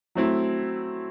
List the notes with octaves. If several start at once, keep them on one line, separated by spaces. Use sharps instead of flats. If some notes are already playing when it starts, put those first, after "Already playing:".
F#3 A3 C4 E4